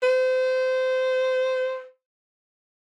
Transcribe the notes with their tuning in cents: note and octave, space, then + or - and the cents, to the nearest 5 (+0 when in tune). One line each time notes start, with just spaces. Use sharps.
C5 -25